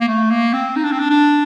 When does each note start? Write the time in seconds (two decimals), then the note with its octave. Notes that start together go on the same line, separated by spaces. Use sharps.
0.01 A#3
0.08 A3
0.30 A#3
0.53 C4
0.76 D#4
0.84 D4
0.92 C4
1.00 D4
1.10 D4